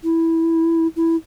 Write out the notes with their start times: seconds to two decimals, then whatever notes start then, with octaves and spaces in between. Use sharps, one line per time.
0.04 E4
0.96 E4